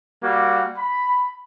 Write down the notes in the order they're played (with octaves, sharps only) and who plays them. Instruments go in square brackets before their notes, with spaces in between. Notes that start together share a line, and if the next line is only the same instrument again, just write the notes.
[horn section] G3 A#3 F#4
B5